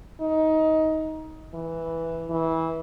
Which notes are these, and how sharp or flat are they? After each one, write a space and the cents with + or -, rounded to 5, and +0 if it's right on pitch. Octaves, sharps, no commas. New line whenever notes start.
D#4 +20
E3 +0
E3 -20